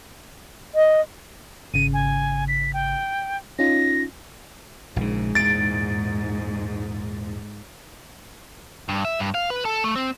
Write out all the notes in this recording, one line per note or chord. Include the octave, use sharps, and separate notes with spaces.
D#5
G#1 C#3 D#7
G#5
B6
G5
C#4 D#4 F4 A#6
A#1 G#2 C#3
E2 A#2 A6 D7
G2
E5
G2
F5
B4
A4
A3
C4